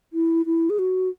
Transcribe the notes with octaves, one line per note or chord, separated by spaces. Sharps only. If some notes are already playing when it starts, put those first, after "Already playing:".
E4
E4
G#4
F#4